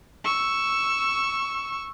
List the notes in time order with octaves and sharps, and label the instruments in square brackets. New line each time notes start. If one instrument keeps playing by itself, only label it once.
[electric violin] C#6 E6